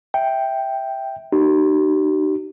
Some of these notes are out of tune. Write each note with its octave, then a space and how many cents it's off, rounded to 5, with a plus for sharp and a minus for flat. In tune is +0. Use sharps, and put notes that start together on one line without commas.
E5 -10 G5 +0
D#4 -35 G4 -45